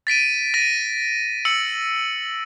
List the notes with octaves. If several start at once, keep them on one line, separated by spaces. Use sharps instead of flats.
A6 B6 D7 D#7
A6 A#6 D7 D#7
E6 C#7 F#7